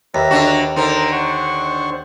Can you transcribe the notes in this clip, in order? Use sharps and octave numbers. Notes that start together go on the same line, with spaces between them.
D#2 B4 E5 A#5
D3 D4 F#4
D3 D#4 A#4 C5
C5 F#5 C#6